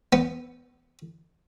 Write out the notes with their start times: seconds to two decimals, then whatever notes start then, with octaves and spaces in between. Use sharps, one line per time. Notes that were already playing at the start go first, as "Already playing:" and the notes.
0.13 B3